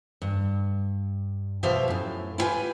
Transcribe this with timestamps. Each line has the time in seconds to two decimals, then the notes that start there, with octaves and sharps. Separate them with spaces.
0.22 G2
1.63 B2 F3 G4 C5 E5 F5
1.88 F#2 A2
2.38 E4 F4 G4 B4 G#5